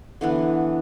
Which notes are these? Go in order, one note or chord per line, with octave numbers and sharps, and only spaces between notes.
D3 E3 B3